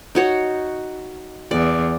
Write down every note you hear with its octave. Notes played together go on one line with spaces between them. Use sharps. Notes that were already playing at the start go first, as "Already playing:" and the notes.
D#4 F#4 C#5
E2 D5